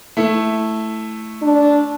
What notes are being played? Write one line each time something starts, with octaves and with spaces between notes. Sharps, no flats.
A3 E4
D4